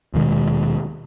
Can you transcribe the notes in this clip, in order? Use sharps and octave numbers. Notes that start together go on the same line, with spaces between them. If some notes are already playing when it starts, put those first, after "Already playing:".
D#1 B2 D#3 G#3